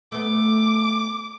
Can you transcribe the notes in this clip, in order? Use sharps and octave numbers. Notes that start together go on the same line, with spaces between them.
A3 B3 D6